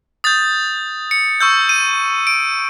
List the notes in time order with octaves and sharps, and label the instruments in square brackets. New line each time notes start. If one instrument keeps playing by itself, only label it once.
[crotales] D#6 G6 A6
C#7
C#6 E6 G6
D#7
D7